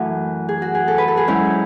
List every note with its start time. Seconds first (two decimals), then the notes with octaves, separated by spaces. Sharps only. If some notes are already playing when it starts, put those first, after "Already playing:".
Already playing: F#2 E3 A3 F#4
0.48 G#4
0.62 F#4
0.75 G#4
0.88 A4
0.98 B4
1.08 A4
1.17 G#4
1.27 G#2 F#3 C#4 E4